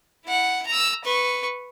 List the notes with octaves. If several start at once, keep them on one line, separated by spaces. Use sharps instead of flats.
E4 F#5
A#5 E6
B4 C#6